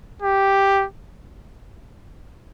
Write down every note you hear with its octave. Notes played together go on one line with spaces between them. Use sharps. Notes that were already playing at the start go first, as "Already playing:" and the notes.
G4